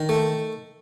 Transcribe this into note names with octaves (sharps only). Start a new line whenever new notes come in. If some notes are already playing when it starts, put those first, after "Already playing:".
Already playing: D#3
A3